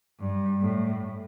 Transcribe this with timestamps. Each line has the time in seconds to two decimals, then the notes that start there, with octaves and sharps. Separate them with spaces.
0.20 G2
0.61 A2